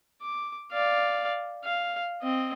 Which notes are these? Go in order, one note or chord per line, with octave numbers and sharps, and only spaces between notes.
D6
D5 F5
F5
C4 D#5